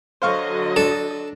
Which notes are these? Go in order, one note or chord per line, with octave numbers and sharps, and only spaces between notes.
D3 F#3 C5 D#5 F5 C#6
D4 A4